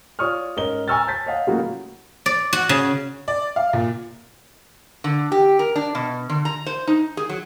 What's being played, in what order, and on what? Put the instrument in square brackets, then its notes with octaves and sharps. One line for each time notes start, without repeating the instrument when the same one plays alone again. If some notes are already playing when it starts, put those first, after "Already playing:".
[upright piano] F4 C#5 D5 C#6 D#6 F6
G#2 C#4 A#4 D#5 G7
G#5 A#5 C#6 E6 F6 A6
A5 G6 A6 B6
C#5 D#5 F5 F#5
A2 C#3 F#3 A#3 F4 F#4
[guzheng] D5
F#4
C#3
[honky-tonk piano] D5
F5
A#2
[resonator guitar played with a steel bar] D3
G4
A#4
D4
B2
D3
A#5
C5
D#4
G#4
F#3